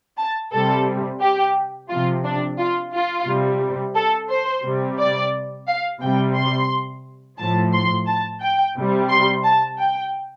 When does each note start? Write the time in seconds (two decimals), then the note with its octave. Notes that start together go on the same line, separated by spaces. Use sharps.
0.17 A5
0.52 C3 G3 A4
1.21 G4
1.89 C3 F3 F4
2.24 D4
2.58 F4
2.93 F4
3.27 C3 G3
3.95 A4
4.30 C5
4.64 C3 G3
4.98 D5
5.67 F5
6.01 C3 G3 G5
6.35 C6
7.38 A2 F3 A5
7.73 C6
8.06 A5
8.41 G5
8.75 C3 G3
9.09 C6
9.44 A5
9.78 G5